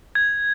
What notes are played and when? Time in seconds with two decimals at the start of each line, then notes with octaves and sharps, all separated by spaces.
0.15 G#6